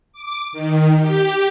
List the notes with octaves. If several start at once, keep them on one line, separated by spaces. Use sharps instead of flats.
D6
D#3
G4